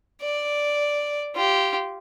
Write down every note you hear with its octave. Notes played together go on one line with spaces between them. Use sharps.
D5
F4 G4